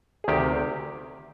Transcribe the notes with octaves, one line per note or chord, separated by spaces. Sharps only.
G#4
D2 C3 D#3 G4